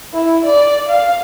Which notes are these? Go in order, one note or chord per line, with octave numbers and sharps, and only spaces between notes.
E4
D5
F5